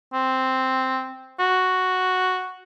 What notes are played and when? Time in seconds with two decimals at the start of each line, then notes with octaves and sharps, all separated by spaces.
0.13 C4
1.39 F#4